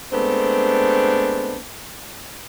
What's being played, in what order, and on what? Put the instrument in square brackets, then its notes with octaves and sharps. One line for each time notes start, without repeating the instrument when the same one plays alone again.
[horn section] G#3 A3 B3 C4 D4